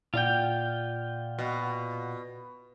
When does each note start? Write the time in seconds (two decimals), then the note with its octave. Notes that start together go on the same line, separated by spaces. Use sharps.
0.14 A#2 F4 D5 F#5 G5
1.39 B2